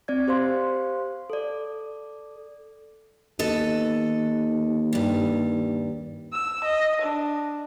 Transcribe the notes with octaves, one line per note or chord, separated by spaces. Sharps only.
C4 D5 G#6
G4 C5 F5 C6
A4 D5
D#2 B3 A4 D#5
G2 G3
E6
D#5
D4